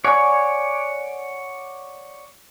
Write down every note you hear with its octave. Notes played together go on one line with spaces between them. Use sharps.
C#5 D5 F#5 G#5